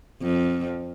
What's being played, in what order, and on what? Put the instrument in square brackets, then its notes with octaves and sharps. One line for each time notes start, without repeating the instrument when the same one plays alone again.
[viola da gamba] F2